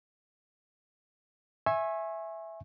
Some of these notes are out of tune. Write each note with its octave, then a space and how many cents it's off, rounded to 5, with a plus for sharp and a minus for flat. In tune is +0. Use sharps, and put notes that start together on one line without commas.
E5 +0 G#5 +0 C#6 -35